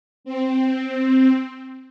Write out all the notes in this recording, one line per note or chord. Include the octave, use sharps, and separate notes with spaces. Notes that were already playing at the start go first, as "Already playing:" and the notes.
C4